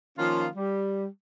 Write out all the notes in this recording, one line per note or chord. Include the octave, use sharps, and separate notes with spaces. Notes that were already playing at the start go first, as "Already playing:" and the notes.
D#3 F3 A#3 C#4 F4
G3